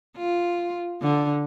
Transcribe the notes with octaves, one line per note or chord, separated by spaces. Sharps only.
F4
D3